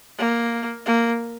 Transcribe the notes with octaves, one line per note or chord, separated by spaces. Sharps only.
A#3
A#3